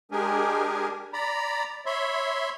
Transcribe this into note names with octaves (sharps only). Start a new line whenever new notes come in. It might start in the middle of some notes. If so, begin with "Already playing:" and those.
G#3 D4 G4 G#4 A#4 G#5
D5 A#5 B5
C#5 E5 B5 C6